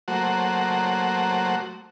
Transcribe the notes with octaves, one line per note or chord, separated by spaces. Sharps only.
F#3 A3 A#3 F#4 C5